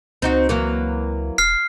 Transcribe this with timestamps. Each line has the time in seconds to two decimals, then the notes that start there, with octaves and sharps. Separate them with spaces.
0.22 C#2 C4 D#4 F#4
0.49 E3 F#3 A#3
1.38 E1 F6 C7